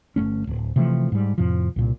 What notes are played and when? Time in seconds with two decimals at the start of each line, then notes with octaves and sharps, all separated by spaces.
0.16 G1 F2 A3 C#4
0.47 D1
0.76 C3 E3 F3 A3
1.12 G#2 G3
1.38 F2 A2 C3 F3
1.76 C2 A#2